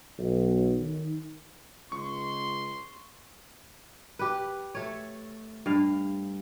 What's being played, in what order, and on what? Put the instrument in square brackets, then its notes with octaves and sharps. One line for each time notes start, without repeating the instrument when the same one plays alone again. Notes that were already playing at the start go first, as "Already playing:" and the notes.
[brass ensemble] B1
D#3
[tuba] C#2 [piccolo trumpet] C6 [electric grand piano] C#6
[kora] G4 B4
A3 C#5
G2 F5